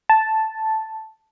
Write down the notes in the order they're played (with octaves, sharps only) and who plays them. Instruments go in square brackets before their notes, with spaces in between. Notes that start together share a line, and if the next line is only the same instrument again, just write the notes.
[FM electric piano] A5